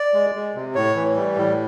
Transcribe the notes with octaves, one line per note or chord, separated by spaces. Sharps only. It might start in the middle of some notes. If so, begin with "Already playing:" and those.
Already playing: D5
G#3
G#3
C3
A2 C#5
E3
G3
A2